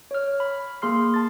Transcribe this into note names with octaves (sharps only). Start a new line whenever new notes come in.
C#5 F6
B5
A#3 G#4 C6 F6 C7
A5 A6